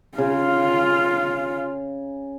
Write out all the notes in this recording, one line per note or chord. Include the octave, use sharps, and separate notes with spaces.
C#3 F4 F5